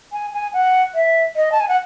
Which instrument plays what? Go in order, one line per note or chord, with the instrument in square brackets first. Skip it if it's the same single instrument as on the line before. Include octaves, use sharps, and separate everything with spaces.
[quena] G#5
G#5
F#5
E5
D#5
A5
G#5
F#5